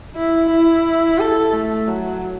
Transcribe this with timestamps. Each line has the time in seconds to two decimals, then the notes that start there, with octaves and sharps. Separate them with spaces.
0.16 E4
0.50 E4
1.19 A4
1.53 A3
1.87 F#3